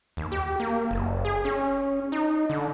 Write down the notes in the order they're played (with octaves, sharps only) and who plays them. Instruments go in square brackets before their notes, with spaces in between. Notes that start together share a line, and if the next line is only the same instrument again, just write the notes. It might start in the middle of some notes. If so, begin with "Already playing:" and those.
[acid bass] D#2
G4
A#3
F#1
G#4
C#4
D#4
D3